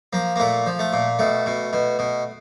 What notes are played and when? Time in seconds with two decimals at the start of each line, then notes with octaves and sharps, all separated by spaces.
0.13 F3 A#3
0.36 A#3
0.40 A#2 A3
0.66 F3
0.79 A3
0.93 A#2
1.19 B2 A3
1.46 B2
1.73 B2
1.99 B2